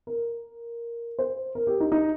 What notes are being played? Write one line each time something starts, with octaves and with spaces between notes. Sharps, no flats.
A#4
C5
A#4
G4
D#4
D#4